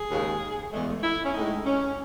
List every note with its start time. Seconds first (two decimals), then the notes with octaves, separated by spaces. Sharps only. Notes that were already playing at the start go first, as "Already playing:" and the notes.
Already playing: G#4
0.10 D#2 C#3 G#3
0.72 E2 C#3 G#3 A3
0.87 A3
1.03 E4
1.25 C#4
1.34 A2 G#3 D#4
1.65 C#4